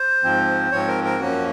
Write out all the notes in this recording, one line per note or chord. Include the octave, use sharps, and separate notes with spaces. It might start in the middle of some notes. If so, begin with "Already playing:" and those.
Already playing: C5
G#2 F3 C4
G#2 F3 C4 C#5
A#4
A#4
F#2 F3 A#3 C#4 F#4